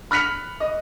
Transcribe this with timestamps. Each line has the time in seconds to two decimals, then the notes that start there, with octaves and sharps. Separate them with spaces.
0.11 B5 F6 F#6 B6 C#7 F7
0.60 D#5